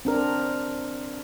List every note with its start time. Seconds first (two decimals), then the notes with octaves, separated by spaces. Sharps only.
0.05 C4 D4 A#4